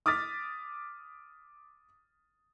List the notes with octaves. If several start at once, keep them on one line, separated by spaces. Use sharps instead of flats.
D6 D#6 F6 A6 B6